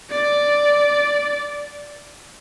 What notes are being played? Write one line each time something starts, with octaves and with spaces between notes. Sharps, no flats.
D5